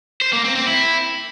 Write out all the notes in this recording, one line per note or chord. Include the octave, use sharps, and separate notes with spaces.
C5
A#3
C4
C4
E4